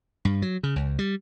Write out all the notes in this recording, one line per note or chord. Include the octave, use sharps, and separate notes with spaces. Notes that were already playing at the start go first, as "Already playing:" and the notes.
G2
F#3
C#3
C#2
G3